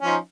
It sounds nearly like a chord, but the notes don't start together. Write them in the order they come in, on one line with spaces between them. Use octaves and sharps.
C#4 F3 D#4